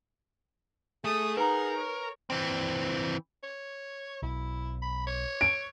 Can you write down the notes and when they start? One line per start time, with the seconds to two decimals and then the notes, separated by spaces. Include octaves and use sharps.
1.04 A3 G#4 D#6
1.37 D#4 A#4 B4 F#5 A#5
1.77 C#5
2.30 E3 C4
3.43 C#5
4.22 B1 E4
4.82 B5
5.07 C#5
5.41 D7